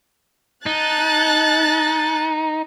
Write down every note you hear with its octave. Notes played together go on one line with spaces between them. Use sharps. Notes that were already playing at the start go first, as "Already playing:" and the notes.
D#4 A5 F#6 A6